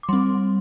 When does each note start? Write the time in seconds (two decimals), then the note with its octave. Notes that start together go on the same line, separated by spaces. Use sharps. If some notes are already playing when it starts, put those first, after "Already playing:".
0.03 D6
0.09 G3 C4 C6